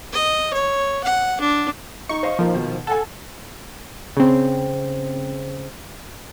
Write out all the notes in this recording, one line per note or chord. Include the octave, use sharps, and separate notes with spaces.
D#5
C#5
F#5
D4
D#4 C#6
C5 D#5 F5
A#2 F3 A#3 D#4
B2 D#3
A4 F#5 G#5
C#3 C4